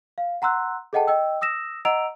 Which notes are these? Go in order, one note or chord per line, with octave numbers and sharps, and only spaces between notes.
F5
F#5 A#5 C6 E6 F#6
G#4 A4 D#5 F#5 G5 A5
D#5 G5 E6
D#6 E6 A#6 E7
D#5 F#5 A#5 E6 D7 F7